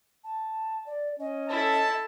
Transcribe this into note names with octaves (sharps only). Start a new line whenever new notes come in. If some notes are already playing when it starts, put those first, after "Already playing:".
A5
D5
C#4 D#5
E4 A4 A5